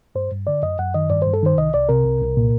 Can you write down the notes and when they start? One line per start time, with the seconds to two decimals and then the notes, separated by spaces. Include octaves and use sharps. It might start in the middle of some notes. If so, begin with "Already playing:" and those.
0.15 G2 C5
0.31 G2
0.47 D3 D5
0.63 F#2 D#5
0.79 F#2 F#5
0.94 D#3 D#5
1.10 G2 D5
1.22 G2 C5
1.33 A4
1.43 D#3 C5
1.57 C2 D#5
1.74 C2 D5
1.89 C3 A#4
2.05 C2
2.21 C2
2.37 A#2